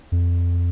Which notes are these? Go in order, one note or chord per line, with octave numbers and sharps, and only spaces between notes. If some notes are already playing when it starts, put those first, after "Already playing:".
F2